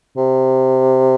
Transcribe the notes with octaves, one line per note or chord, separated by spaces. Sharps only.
C3